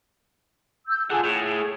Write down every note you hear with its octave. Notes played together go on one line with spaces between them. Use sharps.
E6 G6
F4 G#4 A4 F#5 G#5
A2 G#4